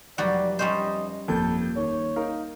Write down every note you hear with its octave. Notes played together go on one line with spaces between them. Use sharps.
F1 F#3 G3 D5 F#6
G3 C#4 C5 D#5
G1 F2 A#3 A4 G6
D#2 C#5
D#4 A#4 F5